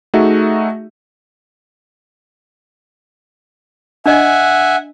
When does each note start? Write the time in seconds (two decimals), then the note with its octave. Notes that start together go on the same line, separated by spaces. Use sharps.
0.14 A3 D#4 F#4 G#4 E5
4.06 D4 D#5 E5 F#5 G#5